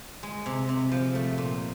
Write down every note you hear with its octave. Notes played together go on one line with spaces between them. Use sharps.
G#3
C3
C3
F3
A3
A#2